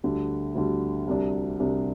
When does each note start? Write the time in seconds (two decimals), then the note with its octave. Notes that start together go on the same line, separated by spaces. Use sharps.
0.03 D2 D3 G3
0.55 D2 D3 G3
1.07 C2 C3 G3 D4
1.60 C2 C3 G3 D4